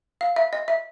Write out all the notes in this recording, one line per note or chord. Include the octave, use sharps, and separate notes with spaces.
F5
E5
D#5
E5